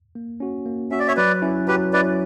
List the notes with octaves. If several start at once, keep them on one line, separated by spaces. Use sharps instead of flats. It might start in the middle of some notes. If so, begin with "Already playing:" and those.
A#3
C#4 F#4
A#3
C#4 F#4 E5
D5
C#5 E5
F#3 B4 D5
C#4 E4
F#3 G4 B4
C#4 E4 B4 D5